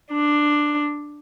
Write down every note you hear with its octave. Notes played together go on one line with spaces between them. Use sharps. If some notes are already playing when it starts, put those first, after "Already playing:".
D4